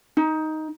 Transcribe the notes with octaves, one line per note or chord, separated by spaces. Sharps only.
D#4